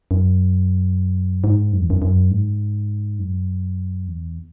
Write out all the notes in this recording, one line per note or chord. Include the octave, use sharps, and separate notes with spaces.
F#2
G#2
F#2
E2
F#2
F#2
G#2
F#2
E2